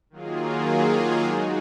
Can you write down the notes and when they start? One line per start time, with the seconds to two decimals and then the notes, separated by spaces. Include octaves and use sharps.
0.10 D#3 F#3 A#3 F4 G#4
1.24 G#3 D#4 F#4